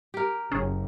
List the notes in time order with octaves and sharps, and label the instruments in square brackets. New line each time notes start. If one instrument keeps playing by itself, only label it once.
[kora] G4 A#4
[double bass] F#1 [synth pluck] C#4 G#4